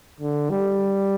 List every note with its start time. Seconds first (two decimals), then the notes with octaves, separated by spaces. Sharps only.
0.20 D3
0.50 G3